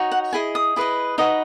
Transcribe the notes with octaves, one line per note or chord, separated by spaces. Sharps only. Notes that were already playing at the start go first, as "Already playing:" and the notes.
Already playing: D#4 F#4 C#5
F#5
E4 G#4 D#5 G#5
D#6
E4 G#4 B4 D#5
D#4 F#4 B4 D#5